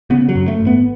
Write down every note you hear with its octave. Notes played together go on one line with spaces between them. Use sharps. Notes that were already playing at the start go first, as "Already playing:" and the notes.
C#3 B3
F#3
F#2
A3
G#1
B3